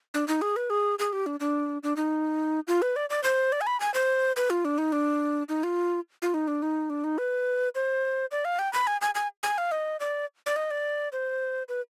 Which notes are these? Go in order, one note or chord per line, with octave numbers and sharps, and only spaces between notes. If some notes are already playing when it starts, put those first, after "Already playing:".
D4
D#4
G#4
B4
G#4
G#4
G4
D4
D4
D4
D#4
F4
B4
D5
D5
C5
D5
G#5
B5
G#5
C5
B4
F4
D4
D#4
D4
D#4
F4
F4
D#4
D4
D#4
D4
D#4
B4
C5
D5
F5
G5
B5
G#5
G#5
G#5
G#5
F5
D#5
D5
D5
D#5
D5
C5
B4